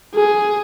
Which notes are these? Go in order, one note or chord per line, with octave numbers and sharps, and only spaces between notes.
G#4